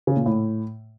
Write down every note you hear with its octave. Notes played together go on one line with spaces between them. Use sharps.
C#3
A#2
A2